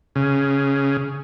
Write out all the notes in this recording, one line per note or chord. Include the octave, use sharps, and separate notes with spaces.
C#3